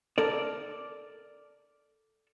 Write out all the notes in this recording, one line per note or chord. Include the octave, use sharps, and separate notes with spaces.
A4 A#4 D5